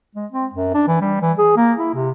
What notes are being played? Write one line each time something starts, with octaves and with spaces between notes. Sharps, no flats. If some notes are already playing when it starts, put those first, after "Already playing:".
G#3
C4
F#2
D4
E3
G3
E3
G#4
A#3
E4
C3